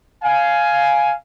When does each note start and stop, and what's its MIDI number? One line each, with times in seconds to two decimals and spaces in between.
0.23 1.12 77
0.23 1.12 80